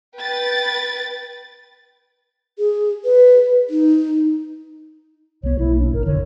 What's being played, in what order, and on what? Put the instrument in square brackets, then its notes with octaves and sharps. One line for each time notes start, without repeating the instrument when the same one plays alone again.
[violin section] B4 G5 A6
[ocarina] G#4
B4
D#4
[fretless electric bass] C2 B3 [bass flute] C#5
[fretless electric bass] B1 A#3 [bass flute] E4
[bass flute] D4
[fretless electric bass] G#1 [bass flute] A#4
[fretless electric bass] F1 D3 [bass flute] C#5